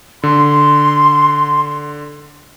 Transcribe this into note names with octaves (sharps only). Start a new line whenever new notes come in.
D3 C6